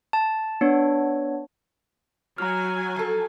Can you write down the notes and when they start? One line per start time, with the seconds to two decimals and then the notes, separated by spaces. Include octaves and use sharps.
0.13 A5
0.61 B3 D4 C#5
2.38 F#3 G#5 A#5 F6
2.96 F3 A4